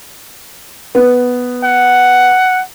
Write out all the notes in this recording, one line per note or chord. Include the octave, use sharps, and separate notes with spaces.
B3
F#5